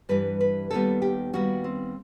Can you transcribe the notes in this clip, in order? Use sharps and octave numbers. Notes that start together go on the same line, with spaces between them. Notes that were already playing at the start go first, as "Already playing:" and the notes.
G2 E3 G3 B4
B4
D#2 D#3 G3 B3 A4
G4
D#2 D#3 G3 B3 F#4
C4